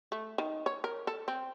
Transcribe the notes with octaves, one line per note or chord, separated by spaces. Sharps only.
A3
D#3
C#5
A#4
A4
C4